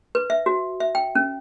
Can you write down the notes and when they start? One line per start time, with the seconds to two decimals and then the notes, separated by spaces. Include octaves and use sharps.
0.15 B4
0.30 E5
0.46 F#4
0.80 E5
0.95 G5
1.15 C#4